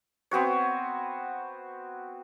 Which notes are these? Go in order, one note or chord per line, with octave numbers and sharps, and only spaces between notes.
B3 C4 F#4 C#5